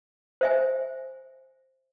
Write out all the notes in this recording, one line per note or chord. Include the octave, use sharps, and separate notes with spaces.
C5 E5 G#5